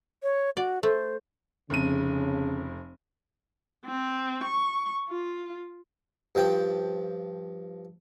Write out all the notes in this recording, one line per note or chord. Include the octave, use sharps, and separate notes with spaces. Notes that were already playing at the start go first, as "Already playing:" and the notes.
C#5
F#4 D5
A3 C5
F1 F2 C#3 D#7
C4
C#6
F4
G2 F3 G5